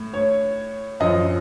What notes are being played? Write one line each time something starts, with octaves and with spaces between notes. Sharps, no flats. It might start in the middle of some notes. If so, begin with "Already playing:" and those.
Already playing: A2
C#5
F#2 F3 D#5